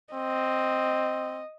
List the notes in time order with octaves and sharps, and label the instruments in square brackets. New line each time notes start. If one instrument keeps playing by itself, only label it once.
[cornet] C4 [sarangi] D#5